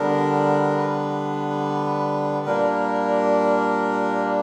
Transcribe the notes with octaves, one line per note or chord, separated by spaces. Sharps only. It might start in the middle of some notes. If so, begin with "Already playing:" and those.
Already playing: D3 G3 B3 D4 A#4
B4
A#2 G3 A#3 D4 A#4